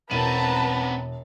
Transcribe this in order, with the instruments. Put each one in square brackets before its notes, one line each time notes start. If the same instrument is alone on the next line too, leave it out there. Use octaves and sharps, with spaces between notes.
[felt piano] E1 D#7 [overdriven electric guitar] B3 C4 [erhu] B4 [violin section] A5 A#5